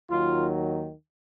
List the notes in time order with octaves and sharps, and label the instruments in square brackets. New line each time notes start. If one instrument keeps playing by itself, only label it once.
[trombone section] D#2 D#3 F#3 F4